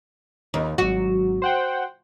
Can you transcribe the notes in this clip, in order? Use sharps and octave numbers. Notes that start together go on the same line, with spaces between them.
D#2
G#1 F#3 F#4
C5 F#5 G5